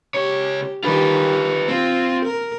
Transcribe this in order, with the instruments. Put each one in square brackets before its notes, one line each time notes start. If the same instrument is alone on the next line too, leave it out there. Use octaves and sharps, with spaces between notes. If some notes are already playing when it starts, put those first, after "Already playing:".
[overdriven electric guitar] C#2 C#5 [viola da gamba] G4
[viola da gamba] D#3 G3 G4 [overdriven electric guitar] F4 B4
[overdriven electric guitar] C4 [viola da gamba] F4
[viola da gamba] A#4